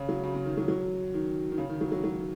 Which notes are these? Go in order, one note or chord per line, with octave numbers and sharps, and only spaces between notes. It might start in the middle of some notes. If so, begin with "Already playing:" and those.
Already playing: C#3
F#3
C#3
C#3
D#3
F#3
F#3
D#3
D#3
C#3
D#3
F#3
F#3
F#3